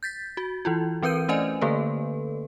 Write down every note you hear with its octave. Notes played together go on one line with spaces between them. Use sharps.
G6 A6 B6
F#4
E3 E4 F4
E3 C4 A#4 B4 G6 D#7
A3 C#4 C5 D5 D#5 G#5
D3 A3 A#3 A4 B4